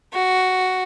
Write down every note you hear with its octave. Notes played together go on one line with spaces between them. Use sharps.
F#4